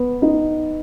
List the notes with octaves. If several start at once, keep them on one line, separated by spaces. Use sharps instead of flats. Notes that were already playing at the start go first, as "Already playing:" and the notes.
Already playing: B3
D#4